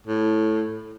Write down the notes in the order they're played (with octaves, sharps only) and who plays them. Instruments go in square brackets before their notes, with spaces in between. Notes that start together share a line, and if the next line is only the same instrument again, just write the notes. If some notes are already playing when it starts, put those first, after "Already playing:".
[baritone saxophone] A2